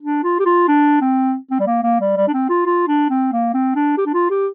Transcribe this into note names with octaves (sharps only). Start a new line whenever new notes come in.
D4
F4
G4
F4
D4
C4
C4
G3
A#3
A#3
G3
G3
D4
C4
F4
F4
D4
C4
A#3
C4
D4
G4
D4
F4
G4